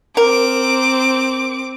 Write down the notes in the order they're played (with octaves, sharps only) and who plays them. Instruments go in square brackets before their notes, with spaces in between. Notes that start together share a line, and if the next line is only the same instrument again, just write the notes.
[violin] C4 D6 [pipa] A#4